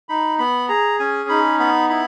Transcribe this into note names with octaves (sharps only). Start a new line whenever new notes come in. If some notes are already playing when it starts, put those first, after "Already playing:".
D#4 B5
B3 B5
G#4 A#5
C#4 G#5
D#4 B5
B3 B5
E4 B5